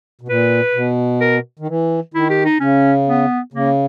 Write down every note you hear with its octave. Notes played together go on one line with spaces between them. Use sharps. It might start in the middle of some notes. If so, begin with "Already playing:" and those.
B2
A#2 B4
B2
A#4
D#3
E3
D#3 E4
G4
D#4
C#3 C#4
B3
C#3 A#3